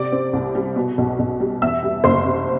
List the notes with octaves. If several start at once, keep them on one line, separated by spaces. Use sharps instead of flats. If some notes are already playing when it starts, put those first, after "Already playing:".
Already playing: C3 D5 D6
C4
C2
G3
B2
B1
B1
G3
E2 E5 E6
G3
F#1 C5 C6
C3